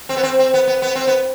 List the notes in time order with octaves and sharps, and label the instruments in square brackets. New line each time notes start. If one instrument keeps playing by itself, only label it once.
[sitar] C4
B3
C4
C4
B3
B3
B3
C4
B3